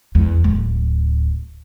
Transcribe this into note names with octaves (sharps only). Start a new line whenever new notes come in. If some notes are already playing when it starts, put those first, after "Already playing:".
E2
D1